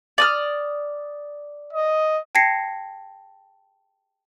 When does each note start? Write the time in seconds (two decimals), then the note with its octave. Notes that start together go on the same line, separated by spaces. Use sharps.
0.18 D5 D#6 F6
1.73 D#5
2.35 G5 A5 G#6 A#6 C7 C#7